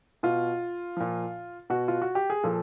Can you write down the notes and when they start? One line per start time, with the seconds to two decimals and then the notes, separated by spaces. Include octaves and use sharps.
0.23 B2 F4
0.97 A#2 F3
1.70 B2 F#4
1.88 F4
2.02 F#4
2.15 G4
2.30 G#4
2.43 A#2 F3 A4